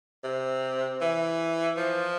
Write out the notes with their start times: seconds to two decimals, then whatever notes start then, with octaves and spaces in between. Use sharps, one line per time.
0.24 C3
1.02 E3
1.77 F3